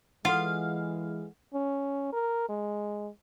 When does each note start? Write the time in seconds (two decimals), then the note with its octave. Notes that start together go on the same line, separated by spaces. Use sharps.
0.25 E3 G#3 F4 A4 F5 F#5
1.54 C#4
2.13 A#4
2.49 G#3